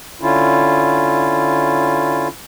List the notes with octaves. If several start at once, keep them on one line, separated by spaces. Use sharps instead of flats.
D3 C#4 E4 F4